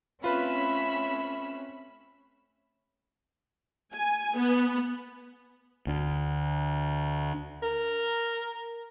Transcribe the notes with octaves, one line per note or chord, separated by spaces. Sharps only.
A3 C4 C#4 F4 B4 E5 B5
G#5
B3
D2
A#4